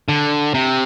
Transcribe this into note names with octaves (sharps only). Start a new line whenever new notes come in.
D3
C3